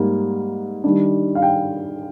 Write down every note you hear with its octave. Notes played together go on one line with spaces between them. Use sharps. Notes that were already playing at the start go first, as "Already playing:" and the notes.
Already playing: G#2 G3 A#3
D#3 G3 D4
F5
G5